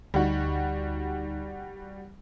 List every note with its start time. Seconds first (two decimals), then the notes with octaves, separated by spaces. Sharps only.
0.14 D2 G3 D#4 F#4